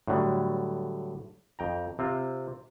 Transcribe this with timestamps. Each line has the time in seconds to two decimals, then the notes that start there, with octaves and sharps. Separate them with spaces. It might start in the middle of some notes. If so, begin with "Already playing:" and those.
0.08 A2 D3 F#3 G3
1.59 F2 G5 A#5
1.99 C3 C4 F4